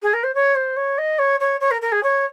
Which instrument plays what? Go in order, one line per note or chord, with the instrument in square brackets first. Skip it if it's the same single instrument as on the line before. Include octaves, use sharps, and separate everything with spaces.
[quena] G#4
A#4
C5
C#5
C5
C#5
D#5
C#5
C#5
C#5
A#4
A#4
G#4
C#5